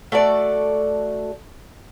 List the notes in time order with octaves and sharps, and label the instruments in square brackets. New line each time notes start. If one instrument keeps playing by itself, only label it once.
[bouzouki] A3 F#4 A4 D5